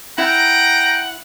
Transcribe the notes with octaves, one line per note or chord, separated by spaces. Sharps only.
E4 F#5 G5 A#5